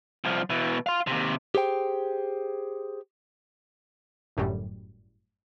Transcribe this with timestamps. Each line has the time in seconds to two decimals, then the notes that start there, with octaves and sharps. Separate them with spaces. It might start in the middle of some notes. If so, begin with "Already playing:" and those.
0.24 C2 F3
0.50 B2 E3
0.86 F5 C6
1.07 D#2 C3
1.55 G4 G#4 C5 G5
4.37 G1 F#2 A2 G3